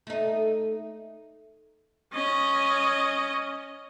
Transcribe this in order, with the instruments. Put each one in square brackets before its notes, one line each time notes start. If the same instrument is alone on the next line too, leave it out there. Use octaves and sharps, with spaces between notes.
[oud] A3 D#4
[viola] C#4 D#5